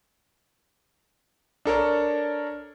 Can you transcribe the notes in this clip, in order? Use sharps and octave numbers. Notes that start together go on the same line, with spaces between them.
D4 A4 A#4 C#5